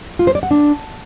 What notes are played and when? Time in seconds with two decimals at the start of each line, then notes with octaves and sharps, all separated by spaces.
0.19 F4
0.27 C5
0.35 D5
0.43 F#5
0.51 D4